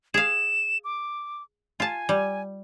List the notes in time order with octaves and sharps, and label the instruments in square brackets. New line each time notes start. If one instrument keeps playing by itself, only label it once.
[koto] G#4 F5 [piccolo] E7
[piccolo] D6
[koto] F4 A5 [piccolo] G#5
[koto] G3